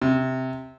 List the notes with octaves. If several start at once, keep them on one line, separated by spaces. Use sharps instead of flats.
C3